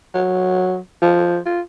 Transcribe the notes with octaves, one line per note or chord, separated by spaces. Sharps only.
F#3
F3
F4